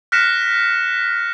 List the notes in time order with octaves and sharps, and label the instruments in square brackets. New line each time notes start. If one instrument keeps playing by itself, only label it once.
[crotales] F6 F#6 A#6 B6 C#7 E7